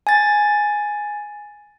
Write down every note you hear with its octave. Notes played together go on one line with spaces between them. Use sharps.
G#5 A6